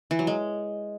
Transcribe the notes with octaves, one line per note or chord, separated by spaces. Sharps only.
E3
F#3
G#3